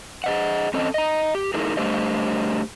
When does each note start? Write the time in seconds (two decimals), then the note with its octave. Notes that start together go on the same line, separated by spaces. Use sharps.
0.24 G#4 D#5 F#5
0.74 C4 C#4 A4 D#5
0.94 D#5 A#5
1.35 G4
1.54 A3 D#4 E4 G#4 A#4
1.77 G3 A3 D4 G4 C5 D#5